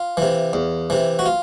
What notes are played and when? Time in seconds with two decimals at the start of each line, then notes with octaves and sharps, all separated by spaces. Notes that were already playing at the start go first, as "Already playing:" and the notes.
Already playing: F4
0.17 C3 E3
0.53 E2
0.90 C3 E3
1.19 F#4
1.26 F4